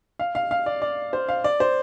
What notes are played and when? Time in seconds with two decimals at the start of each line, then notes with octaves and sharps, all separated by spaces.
0.19 F5
0.35 F5
0.51 F5
0.66 D5
0.82 D5
1.13 C5
1.29 F5
1.44 D5
1.60 C5